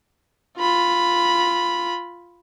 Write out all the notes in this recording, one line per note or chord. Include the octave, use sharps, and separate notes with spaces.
F4 B5